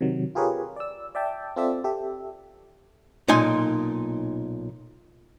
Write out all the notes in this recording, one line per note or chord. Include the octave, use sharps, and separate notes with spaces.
C3 D#3 F#3
F4 G4 G#4 A#4 B4 C#5
D5 E6
D5 E5 G5 A5
C4 F4 A4 D5 E5
G4 A4 E5
B1 A#2 D#4 G#5 C6